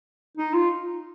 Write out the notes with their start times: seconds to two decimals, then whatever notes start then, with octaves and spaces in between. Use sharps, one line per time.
0.37 D#4
0.54 F4